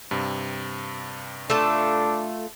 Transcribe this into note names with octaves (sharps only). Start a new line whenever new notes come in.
G2 C3
A3 D4 F4 A4